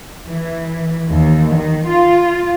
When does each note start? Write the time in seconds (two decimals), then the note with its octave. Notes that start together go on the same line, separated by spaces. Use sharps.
0.27 E3
1.10 D#2
1.56 D#3
1.89 F4